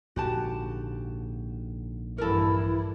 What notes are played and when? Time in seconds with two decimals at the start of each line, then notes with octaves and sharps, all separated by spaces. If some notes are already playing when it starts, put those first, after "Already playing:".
0.16 A#1 G#2 D3 F#4 G4 A5
2.18 G2 E3 E4 A4 A#4